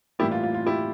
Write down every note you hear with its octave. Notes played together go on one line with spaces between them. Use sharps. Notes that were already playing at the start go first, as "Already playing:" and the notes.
A2 E3 G3 A#3 E4 G4
F4
F4
F4
E4 G4